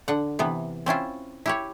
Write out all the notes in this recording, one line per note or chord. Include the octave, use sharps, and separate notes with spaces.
D3 F#5
C3 E3 B3
C4 C#4 E4 F4
E4 G4 C#5